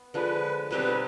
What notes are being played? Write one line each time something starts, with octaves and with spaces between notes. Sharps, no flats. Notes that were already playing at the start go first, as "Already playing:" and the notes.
Already playing: B3
D3 F3 G#3 B4
B2 G3 C4 D#4 B4